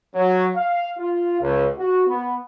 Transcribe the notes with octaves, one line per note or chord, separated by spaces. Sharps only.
F#3
F5
F4
C#2
F#4
B3